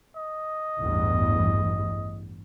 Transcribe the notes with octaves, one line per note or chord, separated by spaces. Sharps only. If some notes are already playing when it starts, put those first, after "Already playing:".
D#5
A1 E2 G2